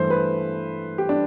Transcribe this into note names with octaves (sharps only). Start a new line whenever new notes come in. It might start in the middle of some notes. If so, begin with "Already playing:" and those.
Already playing: G2 E3 A3 C5
B4
G4
D4